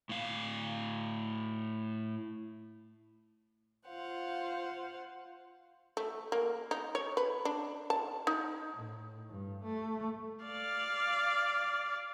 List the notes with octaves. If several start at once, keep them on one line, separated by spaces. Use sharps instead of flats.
A2 F5
F4 C5 F5 F#5
A3
A#3
D#4
C#5
B4
D4
A5
D#4
A2
G2
A3
D5 F5